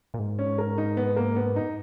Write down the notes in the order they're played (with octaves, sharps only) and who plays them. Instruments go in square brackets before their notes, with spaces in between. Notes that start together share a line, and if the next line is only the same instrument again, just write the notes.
[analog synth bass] A#2
G#2
[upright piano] C#4
A#4
D#4
B3
A#3
B3
D#4